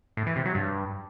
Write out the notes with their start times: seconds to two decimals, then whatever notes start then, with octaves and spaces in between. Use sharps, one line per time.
0.17 A2
0.27 E3
0.36 C3
0.45 F#3
0.55 G2